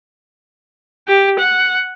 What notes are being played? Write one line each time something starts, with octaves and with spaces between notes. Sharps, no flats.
G4
F#5